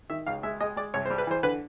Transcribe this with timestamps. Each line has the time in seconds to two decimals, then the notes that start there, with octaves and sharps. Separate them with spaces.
0.10 D#3 E5
0.26 C#2 F5
0.43 G#3 E5
0.61 G#3 D#5
0.76 G#3 D5
0.94 C2 C#5
1.06 C5
1.10 G3
1.18 B4
1.27 E3 C5
1.43 D3 B4